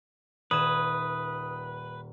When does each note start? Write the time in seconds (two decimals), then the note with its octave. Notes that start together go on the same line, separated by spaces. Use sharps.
0.51 D#1 B4 D#6 G#6 E7